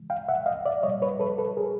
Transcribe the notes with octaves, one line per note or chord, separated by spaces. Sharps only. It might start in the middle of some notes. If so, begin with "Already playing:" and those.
Already playing: C#3 E3 G#3
F5 G5
E5 F#5
D#5 F5
D5 E5
A#2 G3 C#5 D#5
B4 C#5
A4 B4
A4 B4
G#4 A#4